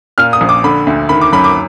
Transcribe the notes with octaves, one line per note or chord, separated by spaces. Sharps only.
A#2 F6
D#6
A#1
D6
D3 B5
D2
D#3 B5
D6
F#2 B5
D6